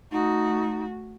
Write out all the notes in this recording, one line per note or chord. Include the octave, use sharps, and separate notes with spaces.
A3 D#4 F#4